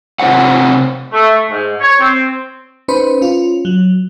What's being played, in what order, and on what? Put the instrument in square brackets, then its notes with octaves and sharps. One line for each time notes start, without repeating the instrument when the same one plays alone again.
[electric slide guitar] C3 F3 C5 C#5 F#5
[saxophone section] A3
G#2
C#5
C4
[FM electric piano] C#4 D#4 B4 C5 B5
C#4 F4
F#3